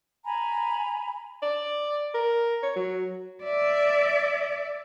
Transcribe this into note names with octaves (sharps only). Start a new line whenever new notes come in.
G#5 A#5 B5
D5
A#4
C#5
F#3
D5 E5